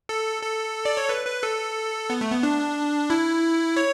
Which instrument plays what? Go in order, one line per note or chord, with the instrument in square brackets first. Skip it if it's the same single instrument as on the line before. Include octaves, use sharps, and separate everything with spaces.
[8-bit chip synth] A4
A4
D5
C#5
B4
B4
A4
B3
A3
B3
D4
E4
C#5